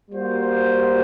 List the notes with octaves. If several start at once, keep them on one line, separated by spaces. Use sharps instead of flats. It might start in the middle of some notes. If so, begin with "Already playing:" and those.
G3 A#3 F#4 C5